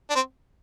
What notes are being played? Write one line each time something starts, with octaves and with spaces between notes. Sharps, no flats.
D4
C4